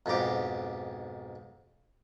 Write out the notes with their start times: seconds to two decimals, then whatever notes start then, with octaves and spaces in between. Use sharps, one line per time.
0.06 B1 F2 G#2 G4 D6